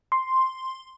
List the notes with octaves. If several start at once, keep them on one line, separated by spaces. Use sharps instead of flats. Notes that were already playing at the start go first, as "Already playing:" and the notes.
C6